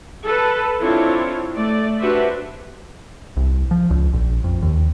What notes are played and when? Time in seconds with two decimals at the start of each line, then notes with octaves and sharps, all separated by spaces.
0.25 A4 B4
0.80 C4 D4 E4 F4 A4 C#5
1.54 A3 D5
2.00 D4 F#4 G4 B4 C5 E5
3.37 C2
3.71 F3
3.90 C#2
4.13 A#1
4.44 F2
4.62 D#2